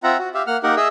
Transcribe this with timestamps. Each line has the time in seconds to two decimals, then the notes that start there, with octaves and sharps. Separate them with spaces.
0.04 C4 F4 E5 F#5 A#5
0.19 F#4
0.34 G4 E5 F5
0.47 A#3 F#5 F6
0.63 A#3 D#4 G4 A#4 F#5
0.76 G#4 D#5 E5 E6